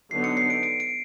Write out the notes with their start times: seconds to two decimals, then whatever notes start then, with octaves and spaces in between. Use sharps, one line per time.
0.11 D3 F#3 B3 D#4 C7
0.24 C#7
0.37 C7
0.50 D7
0.63 D7
0.80 D7